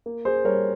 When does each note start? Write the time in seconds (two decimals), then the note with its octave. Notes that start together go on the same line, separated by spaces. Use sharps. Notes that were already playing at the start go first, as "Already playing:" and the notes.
0.06 A#3
0.25 G#4 C5
0.44 G3 A#4 C#5